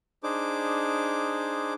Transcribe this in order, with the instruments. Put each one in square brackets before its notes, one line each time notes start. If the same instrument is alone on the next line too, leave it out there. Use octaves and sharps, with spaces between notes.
[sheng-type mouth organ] D4 D#4 G#4 C5 D6